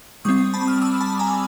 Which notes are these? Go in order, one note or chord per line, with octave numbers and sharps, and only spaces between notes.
G3 C4 C#6 D#6
A5 B5
D#6 F6
D6 E6
A5 B5
G#5 A#5